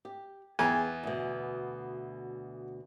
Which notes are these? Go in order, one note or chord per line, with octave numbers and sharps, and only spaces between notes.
G4
E2 G#4 B4 G5 G#5
D2 B2